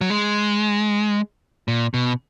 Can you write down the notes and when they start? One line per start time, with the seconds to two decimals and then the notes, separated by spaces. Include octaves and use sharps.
0.01 F#3
0.10 G#3
1.68 A#2
1.94 B2